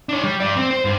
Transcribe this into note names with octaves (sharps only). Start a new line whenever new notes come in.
D4 C#5
G3
G2 D5
C4
C5
G2